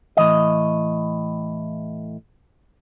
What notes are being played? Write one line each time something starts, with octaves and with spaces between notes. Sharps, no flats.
A2 E3 D#5